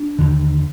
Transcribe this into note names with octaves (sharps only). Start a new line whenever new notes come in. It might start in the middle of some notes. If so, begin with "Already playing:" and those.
Already playing: D4
D#2 D3